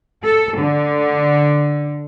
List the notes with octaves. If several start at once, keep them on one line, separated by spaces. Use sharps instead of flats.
A4
D3